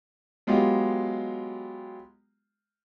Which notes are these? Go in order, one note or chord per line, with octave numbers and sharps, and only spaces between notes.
F#3 G#3 B3 F4 G4